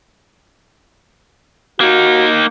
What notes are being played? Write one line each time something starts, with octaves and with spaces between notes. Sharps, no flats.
A#3 D#4 F#4